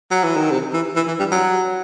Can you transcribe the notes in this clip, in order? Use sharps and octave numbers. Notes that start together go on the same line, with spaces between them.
F#3
E3
D#3
C3
E3
E3
E3
G3
F#3